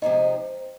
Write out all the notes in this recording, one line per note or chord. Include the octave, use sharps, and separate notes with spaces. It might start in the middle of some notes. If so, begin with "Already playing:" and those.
C3 F3 G#3 C4 D#4 D#5